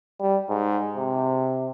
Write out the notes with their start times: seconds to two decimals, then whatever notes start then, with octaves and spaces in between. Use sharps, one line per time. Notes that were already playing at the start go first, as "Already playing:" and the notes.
0.20 G3
0.49 G#2
0.97 C3